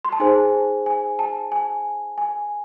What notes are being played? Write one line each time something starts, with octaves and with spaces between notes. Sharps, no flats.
C6
A5
D#4 G#4 C5 G#5
G#5
A5
G#5
G#5